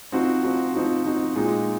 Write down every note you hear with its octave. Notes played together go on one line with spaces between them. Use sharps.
F3 C4 D#4 F#4
F3 C4 D#4 F#4
F3 C4 D#4 F#4
F3 C4 D#4 F#4
A#2 G#3 D#4